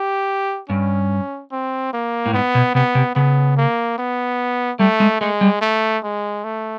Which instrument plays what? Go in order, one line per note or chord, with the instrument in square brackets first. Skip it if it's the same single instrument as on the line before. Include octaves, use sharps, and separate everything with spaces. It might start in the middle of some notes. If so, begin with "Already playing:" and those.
Already playing: [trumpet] G4
[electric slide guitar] G2 [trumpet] C#4
[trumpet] C4
A#3
[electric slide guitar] A2
[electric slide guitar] G#2 [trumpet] B3
[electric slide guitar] B2
[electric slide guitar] C3 [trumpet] B3
[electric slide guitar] C3
[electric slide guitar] C#3 [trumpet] B3
[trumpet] A#3
B3
[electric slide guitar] G3 [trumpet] A3
[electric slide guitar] G#3
[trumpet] G#3 [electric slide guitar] A3
[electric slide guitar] G3
[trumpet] A3
G#3
A3